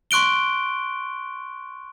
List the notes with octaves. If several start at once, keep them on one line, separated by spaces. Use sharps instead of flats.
C6 C#6 F#6 D7 G7